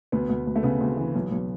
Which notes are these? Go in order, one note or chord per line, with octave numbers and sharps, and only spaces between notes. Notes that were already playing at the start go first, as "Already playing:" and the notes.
D2 B3
D2
D2
A3
C#3 B3
D2
E3
B1
B1